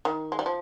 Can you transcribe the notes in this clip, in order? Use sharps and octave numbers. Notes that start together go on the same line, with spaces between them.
D#3
G#3
G3
F3